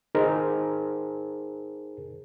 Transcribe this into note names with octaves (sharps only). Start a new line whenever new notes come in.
D#4 G#4 A#4 C5